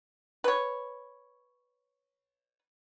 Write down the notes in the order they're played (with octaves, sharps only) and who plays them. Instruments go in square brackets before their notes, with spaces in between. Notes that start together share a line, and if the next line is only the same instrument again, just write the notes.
[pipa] B4 C#5